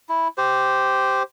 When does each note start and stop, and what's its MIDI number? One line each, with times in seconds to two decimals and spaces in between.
0.09 0.28 64
0.38 1.23 67
0.38 1.23 72